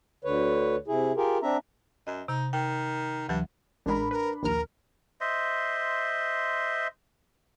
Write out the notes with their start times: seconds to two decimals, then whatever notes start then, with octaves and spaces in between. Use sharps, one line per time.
0.24 D2 D3 B4 C#5
0.87 C3 E4 G#4
1.16 F4 G4 G#4 A#4
1.42 C4 D4 E5 A#5
2.07 F#2 D#5
2.28 C3 D#4
2.53 D#3 G5
3.29 D2 G2 E3 F#3
3.86 A1 G#3 D4 A#4 B5
4.11 A#4 B4
4.43 A#1 D#2 A#4 F6
5.21 C5 D#5 E5 C6